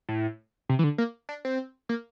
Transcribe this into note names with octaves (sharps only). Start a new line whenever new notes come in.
A2
C3
E3
D3
A#3
D4
C4
A#3